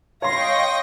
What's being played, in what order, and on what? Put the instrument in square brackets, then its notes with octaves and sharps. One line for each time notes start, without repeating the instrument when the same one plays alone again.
[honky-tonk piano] C#5 C6 [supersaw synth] D#5 G5 C#6 [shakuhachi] F5 [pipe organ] A#6